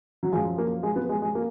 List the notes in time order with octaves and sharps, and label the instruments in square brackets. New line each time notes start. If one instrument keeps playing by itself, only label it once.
[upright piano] F#3
F3 G#3
F#2
A#3
G#3
B3
G#3
G#3
A#3